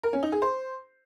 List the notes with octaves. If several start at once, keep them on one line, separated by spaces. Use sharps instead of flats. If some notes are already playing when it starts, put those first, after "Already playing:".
A#4
C#4
D#4
G#4
C5